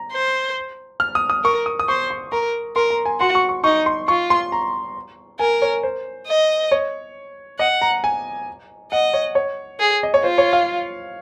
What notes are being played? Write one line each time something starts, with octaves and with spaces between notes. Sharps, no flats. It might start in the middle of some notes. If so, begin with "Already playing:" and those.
Already playing: A#5
C5
F6
D#6
D#6
A#4 C#6
D#6
D#6
C5 C#6
C6
A#4 A#5
A#4 C6
A#5
G#5
F#4 C6
C#6
C#6
D#4 C#6
C6
F4 C#6
C6
A#5
A#4 G#5
C#5
C5
D#5
C#5
D#5 F#5
A#5
G#5
D#5 F#5
C#5
C#5
G#4
D#5
C#5
F4 C5
C#5
F5